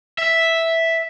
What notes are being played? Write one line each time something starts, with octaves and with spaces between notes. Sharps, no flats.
E5